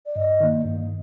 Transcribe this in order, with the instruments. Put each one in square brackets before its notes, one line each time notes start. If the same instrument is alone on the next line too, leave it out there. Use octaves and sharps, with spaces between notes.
[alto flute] D5
[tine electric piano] G2 [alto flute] D#5
[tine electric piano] D#3 A#3
G2